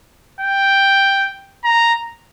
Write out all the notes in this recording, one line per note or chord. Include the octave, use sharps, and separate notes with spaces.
G5
A#5